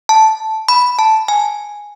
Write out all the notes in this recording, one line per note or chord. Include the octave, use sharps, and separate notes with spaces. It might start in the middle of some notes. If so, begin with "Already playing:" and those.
A5
B5
A5
G#5